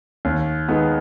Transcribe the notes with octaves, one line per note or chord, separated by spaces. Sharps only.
D#2
D#3 G#3 B3